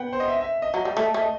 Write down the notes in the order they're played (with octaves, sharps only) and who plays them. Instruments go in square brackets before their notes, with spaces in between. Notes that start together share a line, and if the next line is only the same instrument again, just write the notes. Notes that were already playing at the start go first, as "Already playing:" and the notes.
Already playing: [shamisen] B3 [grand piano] F#5 G5
[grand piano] C5
D#5
E5
E5
D#5
[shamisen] F#3
G3
A3
A3
[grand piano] D#5